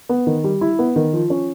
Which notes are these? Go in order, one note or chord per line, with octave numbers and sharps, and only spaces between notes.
B3
D#3
G3
E4
B3
D#3
F3
C#4